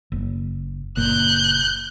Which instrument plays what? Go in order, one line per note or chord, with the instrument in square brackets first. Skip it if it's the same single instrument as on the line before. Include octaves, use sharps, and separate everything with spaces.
[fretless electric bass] F#1
[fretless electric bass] F#1 A#2 [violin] F#6 G6